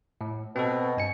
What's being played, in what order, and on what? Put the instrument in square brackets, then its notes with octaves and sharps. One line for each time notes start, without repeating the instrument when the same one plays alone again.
[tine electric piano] A2
[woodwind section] B2 [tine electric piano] C4 A4
[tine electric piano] G2 G#5 C#7